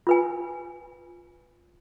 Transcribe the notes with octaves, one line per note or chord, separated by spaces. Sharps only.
F4 B4 G#5